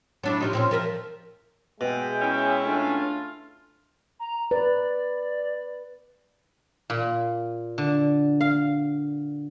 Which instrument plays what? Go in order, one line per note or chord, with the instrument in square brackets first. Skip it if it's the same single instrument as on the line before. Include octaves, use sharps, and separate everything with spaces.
[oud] F#3 D4 E4
C3 F3 D#4
A#2 C4 C#4
F3 A#4 E5
[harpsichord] B2 [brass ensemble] G#3 E5 G5
[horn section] C#4 E4
[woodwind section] A3 D4 F4
[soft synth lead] A#5
[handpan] B4 [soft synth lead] D5
[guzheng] A#2
D3
F5